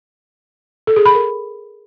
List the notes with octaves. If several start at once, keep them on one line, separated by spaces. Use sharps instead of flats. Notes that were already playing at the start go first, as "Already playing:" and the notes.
A4
G#4
B5
A#4